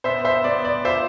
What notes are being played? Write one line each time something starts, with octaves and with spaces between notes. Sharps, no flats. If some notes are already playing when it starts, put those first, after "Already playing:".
B3 C5 E5
C5 E5
B3 D5
D5
F4 C5 E5